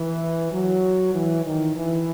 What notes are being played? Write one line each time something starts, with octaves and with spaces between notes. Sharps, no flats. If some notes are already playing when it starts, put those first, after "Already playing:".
Already playing: E3
F#3
E3
D#3
E3